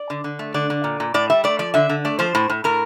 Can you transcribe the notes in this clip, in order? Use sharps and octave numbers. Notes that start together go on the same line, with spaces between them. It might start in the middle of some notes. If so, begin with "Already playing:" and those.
Already playing: D5
D3
D3
A3
D3 D5
D3
A#2
A#2
A2 D5
G3 E5
A3 D5
F3 D5
D3 E5
D3
A3 D5
F3 C5
A2
A2
A2 A#4